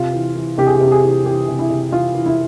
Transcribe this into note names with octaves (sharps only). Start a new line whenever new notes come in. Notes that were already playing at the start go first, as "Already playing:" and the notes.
Already playing: C3 F4
E3
E3
C3 G4
G#4
G4
C3
G4
G#4
E3
E3 G4
C3
E4
C3
E3 F4
E3
E4